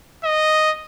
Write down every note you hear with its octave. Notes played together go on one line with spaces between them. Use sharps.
D#5